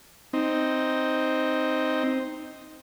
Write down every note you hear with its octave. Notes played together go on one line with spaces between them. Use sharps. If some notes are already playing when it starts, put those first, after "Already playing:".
C4 D#4